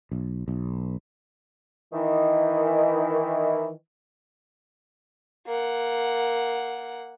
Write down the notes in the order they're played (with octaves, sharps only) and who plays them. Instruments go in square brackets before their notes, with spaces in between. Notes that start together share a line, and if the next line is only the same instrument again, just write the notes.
[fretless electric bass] B1
B1
[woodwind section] D#3 E3
[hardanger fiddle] A#3 F#5